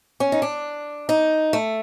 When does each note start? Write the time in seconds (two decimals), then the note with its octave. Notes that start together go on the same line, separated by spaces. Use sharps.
0.20 C#4
0.32 D#4
0.42 D4
1.09 D#4
1.53 A3